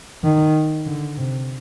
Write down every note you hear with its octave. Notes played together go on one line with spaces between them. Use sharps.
D#3
D3
C3